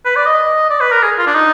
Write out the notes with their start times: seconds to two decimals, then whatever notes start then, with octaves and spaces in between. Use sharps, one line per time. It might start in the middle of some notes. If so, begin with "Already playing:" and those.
0.05 B4
0.16 D5
0.27 D#5
0.70 D5
0.80 B4
0.92 A#4
1.02 G#4
1.18 F4
1.27 D4
1.35 D#4